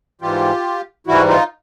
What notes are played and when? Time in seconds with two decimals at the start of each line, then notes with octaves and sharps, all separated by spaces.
0.21 G#2 E3 G3 F4 G4
1.07 G#2 E3 G3 E4 F#4
1.28 D#4 F4